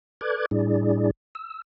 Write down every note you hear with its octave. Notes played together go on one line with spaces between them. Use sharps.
A4 B4 D5 D6 F#6 G#6
A2 G3 D4 E4 G#4 D5
E6